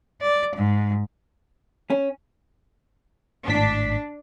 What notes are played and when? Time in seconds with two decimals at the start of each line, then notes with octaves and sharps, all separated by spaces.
0.22 D5
0.56 G#2
1.90 C#4
3.48 G#1 A2 D4 B6